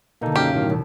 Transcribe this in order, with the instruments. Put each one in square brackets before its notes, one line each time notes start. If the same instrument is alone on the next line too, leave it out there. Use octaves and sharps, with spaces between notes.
[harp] B2 D3 [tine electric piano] A#3 D#4 A4
[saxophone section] F#2 F5 [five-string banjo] G4
[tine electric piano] A2 D#3 F#3
[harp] E1